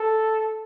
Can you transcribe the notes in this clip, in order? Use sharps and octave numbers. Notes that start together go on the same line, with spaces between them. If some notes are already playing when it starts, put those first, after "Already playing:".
Already playing: A4